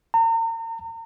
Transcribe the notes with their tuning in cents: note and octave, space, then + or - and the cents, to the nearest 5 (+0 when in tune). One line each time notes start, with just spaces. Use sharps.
A#5 -40